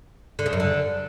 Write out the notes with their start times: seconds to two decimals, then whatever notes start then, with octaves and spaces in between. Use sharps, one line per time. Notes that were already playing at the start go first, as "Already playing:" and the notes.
0.39 D3
0.46 C#3
0.53 F#2
0.60 D3